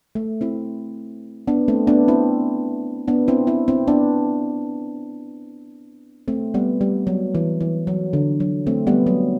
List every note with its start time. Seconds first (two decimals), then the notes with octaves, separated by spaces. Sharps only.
0.15 A3
0.41 C4 E4
1.47 B3 D4
1.68 A3 C4
1.87 B3 D4
2.08 C4 E4
3.08 B3 D4
3.28 C4 E4
3.47 C4 E4
3.68 C4 E4
3.88 B3 D4
6.28 A3 C4
6.54 G3 B3
6.81 G3
7.07 F#3
7.35 E3
7.61 E3
7.87 F#3
8.13 D3
8.40 F#3
8.67 A3 C4
8.87 G3 B3
9.07 F#3